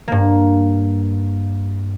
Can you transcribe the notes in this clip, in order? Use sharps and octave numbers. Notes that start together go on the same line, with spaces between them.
G2 A#3